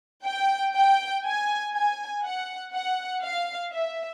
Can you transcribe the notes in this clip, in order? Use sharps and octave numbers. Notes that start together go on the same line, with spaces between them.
G5
G5
G#5
G#5
F#5
F#5
F5
E5